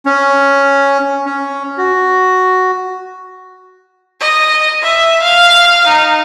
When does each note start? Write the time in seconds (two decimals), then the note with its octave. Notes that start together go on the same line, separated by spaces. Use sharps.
0.06 C#4
1.26 C#4
1.78 F#4
4.20 D#5
4.82 E5
5.22 F5
5.87 D#4